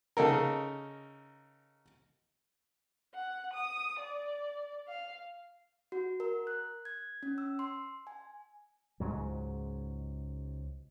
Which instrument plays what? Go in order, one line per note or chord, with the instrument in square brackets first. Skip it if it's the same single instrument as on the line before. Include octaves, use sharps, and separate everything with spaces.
[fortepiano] C#3 D#4 A4 A#4
[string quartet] F#5
D#6
D5
F5
[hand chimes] F#4
A#4
F#6
G#6
C#4
E6
C6
G#5
[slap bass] C#2 G#2 F#3